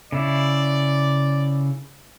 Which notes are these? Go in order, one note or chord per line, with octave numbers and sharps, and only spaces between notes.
C#3 E4 D5